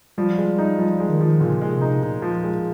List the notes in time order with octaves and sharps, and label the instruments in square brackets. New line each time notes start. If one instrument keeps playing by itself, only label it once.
[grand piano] F3 [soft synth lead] G3
[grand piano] G#3
D#4
[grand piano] F3 [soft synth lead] G3
[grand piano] G#3
[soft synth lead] D#3
[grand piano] F3
[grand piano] A#2 [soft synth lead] C#3
[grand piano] G#3
[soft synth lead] C3
[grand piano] D#4
[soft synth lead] A#2 [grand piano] D#4
[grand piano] F3
G#3